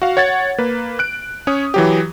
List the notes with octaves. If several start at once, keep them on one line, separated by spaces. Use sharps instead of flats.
F#4 F5
C#5 F#5 G#6 A6
A#3 B4
F#6 D7
C#4 C#5 D#6
E3 F#3 G4